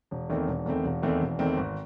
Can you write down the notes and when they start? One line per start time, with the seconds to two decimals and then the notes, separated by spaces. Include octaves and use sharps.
0.11 E1
0.29 E2 D#3 A3 C4
0.47 E1
0.66 E2 D#3 A3 C4
0.85 E1
1.02 E2 D#3 A3 C4
1.21 E1
1.39 E2 D#3 A3 C4
1.57 G#1